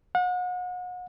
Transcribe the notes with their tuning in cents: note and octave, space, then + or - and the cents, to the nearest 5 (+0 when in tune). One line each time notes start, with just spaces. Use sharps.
F#5 -35